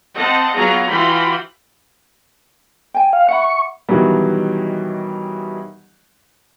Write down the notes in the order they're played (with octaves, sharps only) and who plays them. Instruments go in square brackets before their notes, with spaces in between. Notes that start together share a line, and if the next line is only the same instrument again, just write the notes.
[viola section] C4 D#5 F#5 A5
F#3 B3 F4 G#4 F5 A#5
E3 F4 F#4 G5 B5 C6
[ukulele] G5 G#5
[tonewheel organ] F5
[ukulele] E5 F#5 B5 [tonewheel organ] C#6
[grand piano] B2 D#3 E3 F#3 G3